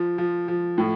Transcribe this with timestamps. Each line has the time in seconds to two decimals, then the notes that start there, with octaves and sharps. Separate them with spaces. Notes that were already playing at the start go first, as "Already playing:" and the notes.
Already playing: F3
0.18 F3
0.48 F3
0.78 A2